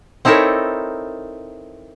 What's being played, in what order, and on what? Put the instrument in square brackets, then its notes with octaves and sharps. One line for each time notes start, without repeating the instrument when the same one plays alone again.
[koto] C4 D#4 E4 A4 A#4 C#5